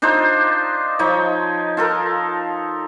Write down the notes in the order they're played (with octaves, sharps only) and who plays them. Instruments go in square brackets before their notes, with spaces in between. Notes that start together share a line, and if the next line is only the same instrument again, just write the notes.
[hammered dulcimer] D4 D#4 F4 C5
F3 D#4 C#5
F4 A4 A#4